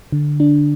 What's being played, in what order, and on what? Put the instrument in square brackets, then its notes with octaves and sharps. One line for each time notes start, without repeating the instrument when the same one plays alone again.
[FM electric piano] D3
D4